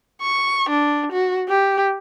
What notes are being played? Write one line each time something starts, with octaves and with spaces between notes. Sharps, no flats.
C#6
D4
F#4
G4